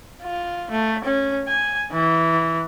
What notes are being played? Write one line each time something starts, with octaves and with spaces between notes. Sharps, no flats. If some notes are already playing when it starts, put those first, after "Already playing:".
F4
A3
C#4
G#5
E3